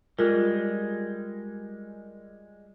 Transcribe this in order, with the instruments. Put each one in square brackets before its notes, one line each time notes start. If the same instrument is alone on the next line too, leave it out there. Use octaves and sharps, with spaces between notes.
[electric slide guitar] G3 G#3 [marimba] F4 [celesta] G#4 A#4